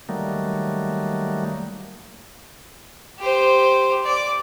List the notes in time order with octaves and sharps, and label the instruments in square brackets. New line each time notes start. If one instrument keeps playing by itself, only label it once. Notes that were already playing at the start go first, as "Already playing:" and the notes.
[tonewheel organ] D#3 F#3 G3 A3 A#3
[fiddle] G4 C5
D5 D6